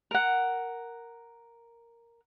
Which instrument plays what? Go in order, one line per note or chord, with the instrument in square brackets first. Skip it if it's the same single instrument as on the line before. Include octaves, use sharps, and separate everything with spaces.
[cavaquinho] A#4 F#5